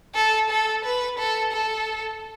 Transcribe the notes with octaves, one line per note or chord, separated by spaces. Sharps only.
A4
A4
B4
A4
A4